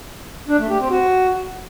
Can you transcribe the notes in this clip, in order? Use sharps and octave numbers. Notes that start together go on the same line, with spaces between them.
D4
A3
G4
C4
F#4